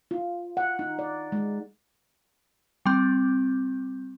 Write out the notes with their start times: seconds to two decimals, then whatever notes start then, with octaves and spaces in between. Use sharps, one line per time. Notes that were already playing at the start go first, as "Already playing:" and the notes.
0.11 F4
0.57 F#5
0.79 D#4
0.99 D5
1.32 G#3
2.86 G3 C4